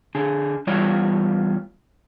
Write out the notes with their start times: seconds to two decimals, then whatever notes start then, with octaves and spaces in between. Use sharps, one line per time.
0.15 D3 G#4
0.67 E2 G3 F4 C#5